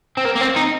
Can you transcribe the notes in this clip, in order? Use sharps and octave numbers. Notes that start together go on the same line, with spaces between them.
C4
A#3
A#3
C4
D#4